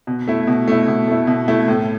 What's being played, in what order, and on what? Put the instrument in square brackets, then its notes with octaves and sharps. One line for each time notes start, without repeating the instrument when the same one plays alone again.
[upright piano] B2
A3 E4
B2
A3 E4
B2
A3 E4
B2
A3 E4
A2